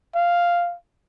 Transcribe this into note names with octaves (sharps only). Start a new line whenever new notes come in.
F5